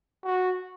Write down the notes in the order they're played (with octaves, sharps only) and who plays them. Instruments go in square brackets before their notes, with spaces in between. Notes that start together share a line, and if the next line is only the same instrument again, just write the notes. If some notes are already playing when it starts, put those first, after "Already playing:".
[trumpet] F#4